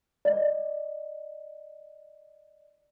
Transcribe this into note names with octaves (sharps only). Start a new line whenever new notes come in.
D5 D#5